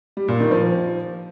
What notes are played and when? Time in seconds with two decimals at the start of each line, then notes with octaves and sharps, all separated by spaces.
0.17 G3
0.28 A#2
0.40 D#3
0.51 F3